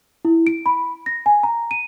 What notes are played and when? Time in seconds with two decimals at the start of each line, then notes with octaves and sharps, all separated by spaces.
0.25 E4
0.47 D7
0.66 B5
1.06 A#6
1.26 G#5
1.43 A#5
1.71 D#7